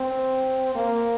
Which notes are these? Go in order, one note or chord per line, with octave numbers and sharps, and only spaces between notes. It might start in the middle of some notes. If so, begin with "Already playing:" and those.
Already playing: C4
A#3